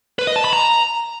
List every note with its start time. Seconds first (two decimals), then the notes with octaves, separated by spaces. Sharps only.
0.19 B4
0.27 D#5
0.36 A5
0.44 B5
0.53 A#5